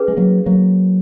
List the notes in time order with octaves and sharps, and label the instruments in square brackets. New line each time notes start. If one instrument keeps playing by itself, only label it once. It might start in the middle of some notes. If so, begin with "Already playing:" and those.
Already playing: [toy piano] C#4 G#4 B4
[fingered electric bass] G#3
F#3 A#3
F#3 A#3